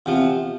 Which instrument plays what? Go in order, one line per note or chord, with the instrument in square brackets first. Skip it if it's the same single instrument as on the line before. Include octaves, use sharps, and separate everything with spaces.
[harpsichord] E2 C3 F3